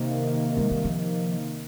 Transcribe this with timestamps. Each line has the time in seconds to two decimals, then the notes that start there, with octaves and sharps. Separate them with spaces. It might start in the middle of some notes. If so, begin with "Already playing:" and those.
Already playing: C3 D#3 A#3
0.57 G#3
0.71 G3
0.85 F3